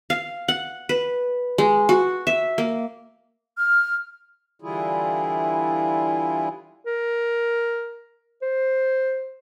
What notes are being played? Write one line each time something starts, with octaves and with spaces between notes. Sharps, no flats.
F5
F#5
B4
G#3
F#4
E5
A#3
F6
D3 E3 G3 E4 F4 G#4
A#4
C5